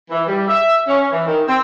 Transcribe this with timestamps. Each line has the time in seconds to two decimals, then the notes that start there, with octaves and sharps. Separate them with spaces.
0.11 E3
0.27 G3
0.48 E5
0.87 C#4
1.11 E3
1.27 D#3
1.48 C4